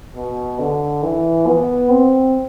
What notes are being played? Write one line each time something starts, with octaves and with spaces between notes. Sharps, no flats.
B2
D3
E3
B3
C4